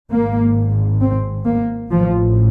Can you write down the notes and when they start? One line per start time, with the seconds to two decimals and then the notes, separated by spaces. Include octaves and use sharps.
0.10 G#1 G#2 A#3
1.00 C4
1.45 A#3
1.90 A1 A2 F3